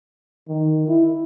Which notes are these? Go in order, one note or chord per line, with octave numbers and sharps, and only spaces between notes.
D#3
E4